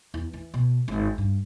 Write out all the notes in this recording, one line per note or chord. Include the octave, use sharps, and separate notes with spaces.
E2
E3
B2
G#1
G2